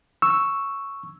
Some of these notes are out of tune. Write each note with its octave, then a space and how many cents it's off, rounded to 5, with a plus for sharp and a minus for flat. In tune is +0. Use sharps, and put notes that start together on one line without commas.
C#6 +0 E6 +0